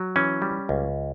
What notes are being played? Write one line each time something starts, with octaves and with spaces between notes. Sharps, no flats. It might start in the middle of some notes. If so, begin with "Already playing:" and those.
Already playing: F#3
E3 C#4
G3
C#2